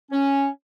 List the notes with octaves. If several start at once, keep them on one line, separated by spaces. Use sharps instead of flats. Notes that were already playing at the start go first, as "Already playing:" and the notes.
C#4